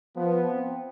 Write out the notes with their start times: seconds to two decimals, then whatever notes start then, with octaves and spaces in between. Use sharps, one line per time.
0.17 F3 B3
0.52 C4